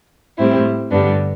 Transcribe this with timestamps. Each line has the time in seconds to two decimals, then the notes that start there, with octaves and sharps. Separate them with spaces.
0.38 A2 G3 C4 E4
0.91 G2 D3 G3 B3 D4